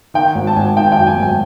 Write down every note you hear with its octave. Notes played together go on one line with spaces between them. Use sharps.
D#3 G5
G#1 F#5
A5
G#1 G#5
D#3 G5
G#5
G5
F#2
G#5
G#1
G#5